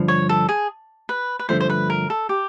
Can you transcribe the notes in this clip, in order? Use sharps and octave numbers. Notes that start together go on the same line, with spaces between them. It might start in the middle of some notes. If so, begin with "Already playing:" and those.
Already playing: G2 D3 F3
C#5
A4
G#4
B4
B4
G2 D3 F3 A3 C5
C5
B4
A#4
A4
G4